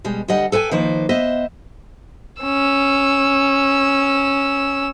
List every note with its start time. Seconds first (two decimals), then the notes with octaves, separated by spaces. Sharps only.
0.04 B2 G3 G#3
0.28 D2 G3 D#5 F#5
0.52 A4 B4 G5 G#5
0.71 D#3 F3 A#3 B4 C5
1.09 B3 C5 D#5 E5
2.43 C#4 E6